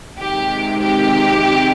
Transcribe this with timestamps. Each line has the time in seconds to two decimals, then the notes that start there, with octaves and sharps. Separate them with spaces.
0.18 C3 D#3 G#3 G4
0.81 G4